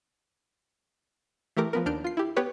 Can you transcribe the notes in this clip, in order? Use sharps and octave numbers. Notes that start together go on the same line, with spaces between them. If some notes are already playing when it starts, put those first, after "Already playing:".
E3 A3 G4 A#4 D6
F3 B3 A#4
D#2 D4 F6 G6 D7
F4 C7
E4 G4
B3 G4 B4 C#5